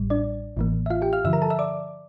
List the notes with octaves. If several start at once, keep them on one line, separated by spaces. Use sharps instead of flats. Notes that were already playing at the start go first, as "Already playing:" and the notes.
Already playing: A1 A2 G3
D4 D5
A1 A2 E3 A#3
E5
F4 F5
G4 G5
F5 F6
G2 D3 F3 E5 E6
A#4 A#5
A4 A5
E5 E6
D5 D6